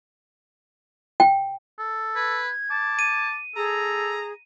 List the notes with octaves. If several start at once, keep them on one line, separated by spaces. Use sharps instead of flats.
G5
A4
B4 G#6
A5 D6
D#7
G#4 A4 A#5